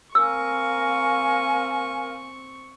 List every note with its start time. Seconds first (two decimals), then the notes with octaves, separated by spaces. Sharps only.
0.15 C4 A#4 F5 G#5 C#6 E6